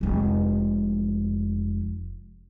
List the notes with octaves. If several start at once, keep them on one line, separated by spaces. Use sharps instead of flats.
F1 G#3